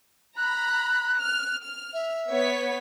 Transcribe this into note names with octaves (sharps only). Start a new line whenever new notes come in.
A#5 B5 F#6
F6
F6
E5
B3 C#5 B6